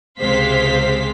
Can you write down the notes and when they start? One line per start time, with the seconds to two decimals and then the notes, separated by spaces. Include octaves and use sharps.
0.21 C#2 C3 G#3 C5 F5 B6